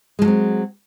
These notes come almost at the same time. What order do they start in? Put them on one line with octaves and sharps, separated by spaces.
G#3 F3 F#3 C4